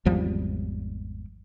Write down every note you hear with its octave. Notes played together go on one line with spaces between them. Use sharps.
G#1 E2 F3 G3